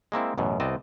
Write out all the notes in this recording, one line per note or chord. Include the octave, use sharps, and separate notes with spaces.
G#3 A#3 C4 E4
A1 F#2 B2
C2 B3 C4 D5 D#5 A5